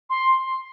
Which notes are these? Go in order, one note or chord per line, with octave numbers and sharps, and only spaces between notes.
C6